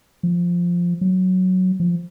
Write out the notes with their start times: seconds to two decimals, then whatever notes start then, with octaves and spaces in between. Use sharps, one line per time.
0.23 F3
1.01 F#3
1.80 F3